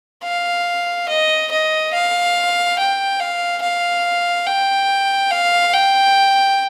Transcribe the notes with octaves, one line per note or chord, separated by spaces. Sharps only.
F5
D#5
D#5
F5
G5
F5
F5
G5
F5
G5